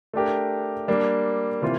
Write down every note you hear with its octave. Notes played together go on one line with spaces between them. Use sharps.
A3 D4 G4 A#4
G3 A#3 D4
C3 E3 A#3 F4 C5